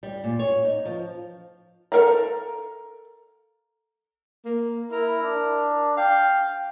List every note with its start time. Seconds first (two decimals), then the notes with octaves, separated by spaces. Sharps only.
0.03 G3
0.24 A#2
0.39 C#5
0.65 D#4
0.85 F3
1.92 A4 A#4 F5 A#5
4.45 A#3
4.92 E4 A#4
5.23 D4
5.97 F5 G5